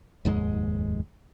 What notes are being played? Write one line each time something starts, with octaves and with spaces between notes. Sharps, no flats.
F1 D#2 G#2 G#3